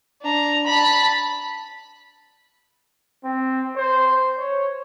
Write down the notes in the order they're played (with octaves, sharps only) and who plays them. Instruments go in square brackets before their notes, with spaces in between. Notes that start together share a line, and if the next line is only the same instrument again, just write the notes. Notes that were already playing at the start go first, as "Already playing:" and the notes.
[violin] D4 A#5
A5 B5
[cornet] C4
C5
C#5